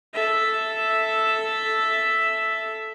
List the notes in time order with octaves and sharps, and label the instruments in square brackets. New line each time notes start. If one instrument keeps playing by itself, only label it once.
[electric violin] A4 E5